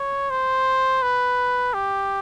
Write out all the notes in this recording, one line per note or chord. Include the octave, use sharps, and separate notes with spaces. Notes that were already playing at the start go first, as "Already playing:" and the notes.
Already playing: C#5
C5
B4
G4